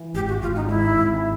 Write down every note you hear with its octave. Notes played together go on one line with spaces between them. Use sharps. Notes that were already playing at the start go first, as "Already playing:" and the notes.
Already playing: E3
G#1 G4
F#4
G#1 F4
D#4
G#2 E4
G#1